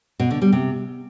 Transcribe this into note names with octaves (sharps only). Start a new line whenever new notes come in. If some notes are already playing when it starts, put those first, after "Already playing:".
B2
D3
G3
C3